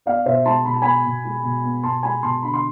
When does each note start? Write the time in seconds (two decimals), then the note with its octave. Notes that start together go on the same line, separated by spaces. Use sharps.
0.06 B3 D5 F5
0.26 B2 C5 E5
0.45 G#3 A5 C6
0.65 B2 B5
0.74 A5
0.82 B3 G#5 B5
1.05 B2
1.25 G#3
1.43 B2
1.64 B3
1.83 B2 A5 C6
2.03 G#3 G#5 B5
2.23 B2 A5 C6
2.42 D3 B5
2.54 C6